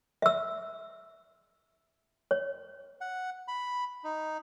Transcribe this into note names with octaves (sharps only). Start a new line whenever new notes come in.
E5 E6
C#5
F#5
B5
D#4